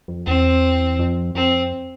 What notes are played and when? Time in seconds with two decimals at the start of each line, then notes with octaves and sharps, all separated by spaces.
0.08 F2
0.26 E2 C4
0.99 F2
1.35 F2 C4